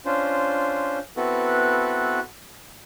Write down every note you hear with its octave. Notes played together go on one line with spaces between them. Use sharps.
C#4 D4 F4 C5
B3 C4 E4 F#4 A4 B4